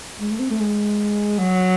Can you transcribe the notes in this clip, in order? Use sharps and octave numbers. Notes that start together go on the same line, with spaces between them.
G#3
A3
C4
A3
G#3
F#3